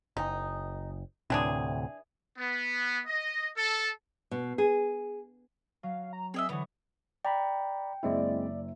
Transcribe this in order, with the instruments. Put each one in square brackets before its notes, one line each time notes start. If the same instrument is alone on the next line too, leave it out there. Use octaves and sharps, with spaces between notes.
[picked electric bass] F#1 [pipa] D#4
[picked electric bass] D2 A2 C3 [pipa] E3 D4 G#4
[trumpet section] B3
D#5
A4
[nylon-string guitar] B2
G#4
[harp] F#3 [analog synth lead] F5
[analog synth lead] A#5
[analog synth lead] C4 [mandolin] G#4 D#5 E5
[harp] D3 E3 C#5 [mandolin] B3 [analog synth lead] D#6
[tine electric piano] D5 A#5 B5 [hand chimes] G5
[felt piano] F#1 E5 [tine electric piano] G#3 C4 E4 [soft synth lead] D5